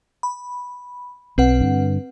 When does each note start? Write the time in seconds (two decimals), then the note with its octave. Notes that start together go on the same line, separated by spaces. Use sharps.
0.23 B5
1.38 B1 C4 B4 F#5
1.61 G2 D3